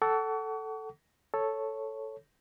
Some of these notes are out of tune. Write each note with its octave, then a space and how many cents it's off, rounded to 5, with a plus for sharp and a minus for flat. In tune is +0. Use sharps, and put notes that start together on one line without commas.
A4 +0 F#5 +30 C#6 +40
A4 +0 C#5 +0